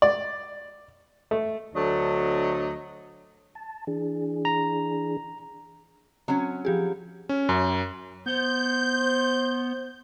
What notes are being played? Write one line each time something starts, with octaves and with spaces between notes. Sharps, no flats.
D5
A3
D2 F#3 A3 D4 D#5
A5
E3 D4 G#4
A#5
F#3 C4 C#4
F3 G4 G#4
C#4
F#2
B3 C5 G6